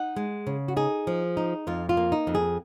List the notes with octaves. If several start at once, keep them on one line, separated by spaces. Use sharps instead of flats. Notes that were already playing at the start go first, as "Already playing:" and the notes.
Already playing: D#4 F#5
G#3
C#3
F#4
D#4 G#4
F3
D#4
F2 F4
F4
A#3
D#4
F2
G#4